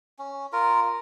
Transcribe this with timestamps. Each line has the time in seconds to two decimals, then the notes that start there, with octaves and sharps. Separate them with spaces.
0.19 C#4
0.52 F4 A#4